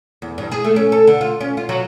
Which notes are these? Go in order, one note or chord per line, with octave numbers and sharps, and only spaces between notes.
E2
G2
G#4
A3
C#4
A4
D3
F4
C#4
F4
F#3